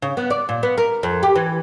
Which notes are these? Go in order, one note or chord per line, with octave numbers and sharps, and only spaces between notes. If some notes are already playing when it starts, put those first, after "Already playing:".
C#3
B3
D5
A#2
B3
A#4
F2
G4
E3